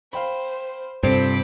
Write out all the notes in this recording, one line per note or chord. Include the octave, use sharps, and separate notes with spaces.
C5 F5 G5 B5
G2 C3 C4 F4 A4 C5 B5 D6